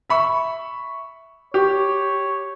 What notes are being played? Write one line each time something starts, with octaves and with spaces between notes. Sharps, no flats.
E5 B5 C#6
G4 C#5